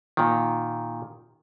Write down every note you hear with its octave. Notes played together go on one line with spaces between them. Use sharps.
A#2 D#3